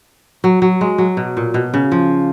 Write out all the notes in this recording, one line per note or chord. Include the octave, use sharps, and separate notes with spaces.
F#3
F#3
G#3
F#3
B2
A#2
B2
C#3
F3